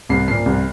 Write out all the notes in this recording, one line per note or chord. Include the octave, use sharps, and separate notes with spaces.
C2 C7
A#2 F3 C7
C2